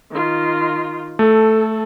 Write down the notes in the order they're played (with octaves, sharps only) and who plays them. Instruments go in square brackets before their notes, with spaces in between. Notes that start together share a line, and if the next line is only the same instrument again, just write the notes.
[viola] D#3 F4
[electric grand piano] A3 [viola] A4